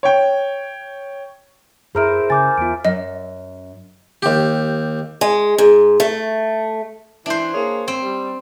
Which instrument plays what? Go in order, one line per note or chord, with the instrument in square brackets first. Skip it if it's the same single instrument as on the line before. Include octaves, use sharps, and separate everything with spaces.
[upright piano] C#5 G5
[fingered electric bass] F#2 [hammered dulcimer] E4 A#4 C5 [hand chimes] G#4 A#5 D7
[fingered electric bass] C#3 [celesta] G#5 D6 G6 [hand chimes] A6
[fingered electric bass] E2 B3 [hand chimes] F4 D7
[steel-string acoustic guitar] F#2 [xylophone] D#5
[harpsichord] D#2 G4
[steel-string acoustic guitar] G#3
G#2
A3
[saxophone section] E3 [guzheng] D4 C5
[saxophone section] A#3 G#4 C#5
[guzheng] C4
[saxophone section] G3